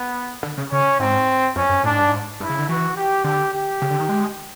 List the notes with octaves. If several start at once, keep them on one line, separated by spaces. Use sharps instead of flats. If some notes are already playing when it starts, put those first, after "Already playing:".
Already playing: B3
D3
C#3
C#3 C#4
G#2 C4
F2 C#4
F#2
A2 D4
G#2
G2
G#2
G2 E4
C#3
D3
E3 F#4
G4
D3 G4
G4
C#3
D3
D#3
G#3